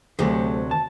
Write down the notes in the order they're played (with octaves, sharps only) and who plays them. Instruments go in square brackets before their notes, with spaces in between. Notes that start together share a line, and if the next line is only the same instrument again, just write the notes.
[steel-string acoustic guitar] D2 C3 F#3 [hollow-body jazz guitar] A3 G4 G#4
[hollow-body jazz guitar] A5